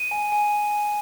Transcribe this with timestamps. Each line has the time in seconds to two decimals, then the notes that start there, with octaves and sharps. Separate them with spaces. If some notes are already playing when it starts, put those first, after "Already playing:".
Already playing: D#7
0.11 G#5
0.32 G#5